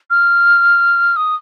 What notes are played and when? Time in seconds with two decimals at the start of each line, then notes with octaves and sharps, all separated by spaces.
0.10 F6
1.16 D#6